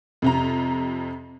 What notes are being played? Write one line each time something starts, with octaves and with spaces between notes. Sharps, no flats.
F2 C3 A#5